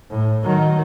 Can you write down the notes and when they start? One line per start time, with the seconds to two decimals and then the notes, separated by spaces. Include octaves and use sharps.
0.10 A2
0.43 D#3 F#3